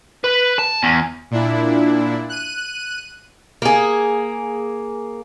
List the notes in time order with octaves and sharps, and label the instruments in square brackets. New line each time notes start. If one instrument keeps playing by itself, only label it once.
[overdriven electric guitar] B4
A5
E2
[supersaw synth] A#2 D4 E4
F#6 D#7
[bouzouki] A#3 G#4